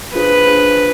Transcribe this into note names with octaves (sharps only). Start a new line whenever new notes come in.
D4 F4 G#4 B4 C5
D4 F4 G#4 C5